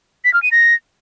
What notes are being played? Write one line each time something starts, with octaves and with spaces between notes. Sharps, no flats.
B6
F6
D#7
A#6